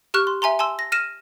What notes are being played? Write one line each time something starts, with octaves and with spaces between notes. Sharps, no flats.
G4 C#6 F6 F#6
C6
E5 G#5 A#5 C6
G#5 A5 C6 E6
A#6
F6 A#6 D#7 E7